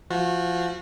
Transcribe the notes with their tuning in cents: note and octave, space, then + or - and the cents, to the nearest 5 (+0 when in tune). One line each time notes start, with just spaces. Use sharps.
F3 -20 F#4 -30